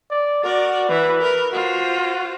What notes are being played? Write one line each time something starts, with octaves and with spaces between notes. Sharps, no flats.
D5
F#4 A#4 D5
E3 E4 B4
A#4
F4 F#4 C5